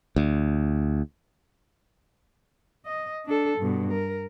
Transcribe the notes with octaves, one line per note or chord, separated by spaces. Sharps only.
D2
D#5
D4 A4
G2 B2
A#4